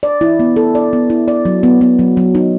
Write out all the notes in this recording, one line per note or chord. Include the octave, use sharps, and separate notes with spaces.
D5
E4
B3
A4
D5
B3
E4
D5
F#3
B3
B3
F#3
F#3
D#4